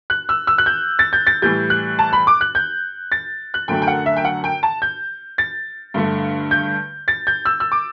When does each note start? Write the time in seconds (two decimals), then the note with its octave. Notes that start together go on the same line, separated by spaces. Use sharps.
0.10 F#6
0.29 E6
0.47 E6
0.58 F#6
0.66 G6
0.99 A6
1.13 G6
1.27 A6
1.42 A2 E3 G3 G6
1.70 F#6
1.99 A5
2.13 B5
2.27 D6
2.41 F#6
2.55 G6
3.12 A6
3.54 F#6
3.68 F#2 D3 F#3 A3 G5
3.82 G5
3.87 F#5
4.06 E5
4.16 G5
4.25 F#5
4.44 G5
4.63 A5
4.82 G6
5.38 A6
5.94 G2 D3 A3
6.51 G6
7.08 A6
7.27 G6
7.45 E6
7.60 E6
7.72 D6